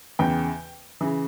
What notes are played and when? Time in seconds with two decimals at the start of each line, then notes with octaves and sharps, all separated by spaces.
0.19 E2 C#3 E3 G5
1.01 C#3 E3